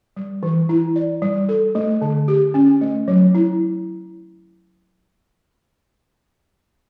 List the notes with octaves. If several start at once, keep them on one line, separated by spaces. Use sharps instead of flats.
G3
E3
E4
D5
G3
A4
A3
D3
G4
C#4
A3
F#3
E4